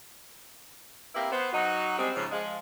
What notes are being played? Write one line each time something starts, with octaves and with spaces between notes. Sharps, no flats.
A#3 C4 E4 G4 B4 F5
B3 C5
F#3 D#4 F#4
G3 G#3 C4
G#2 C#3 F3
F3 G#3